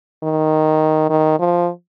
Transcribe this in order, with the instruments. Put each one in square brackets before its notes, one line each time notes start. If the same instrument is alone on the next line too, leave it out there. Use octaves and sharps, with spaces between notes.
[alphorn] D#3
D#3
F3